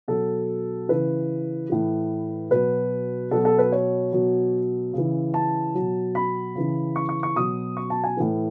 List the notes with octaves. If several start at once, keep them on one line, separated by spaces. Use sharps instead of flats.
B2 F#3 A4
C#3 E3 B4
A2 E3
B2 F#3 B4
B2 F#3 A4
A4
B4
C#5
B2 F#3
C#3 E3
A5
B2 F#3
B5
C#3 E3
C#6
C#6
C#6
B2 F#3 D#6
C#6
A5
G#5
A2 E3